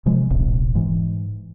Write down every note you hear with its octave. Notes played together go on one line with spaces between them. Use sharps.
C3 F3 G#3
D1 A#1 C3
G#2 E3